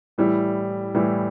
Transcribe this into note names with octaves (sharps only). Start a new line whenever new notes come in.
A2 E3 G3 E4
A2 E3 G3 E4